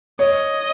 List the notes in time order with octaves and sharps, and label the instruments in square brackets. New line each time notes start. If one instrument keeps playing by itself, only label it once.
[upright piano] C#5 [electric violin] D#5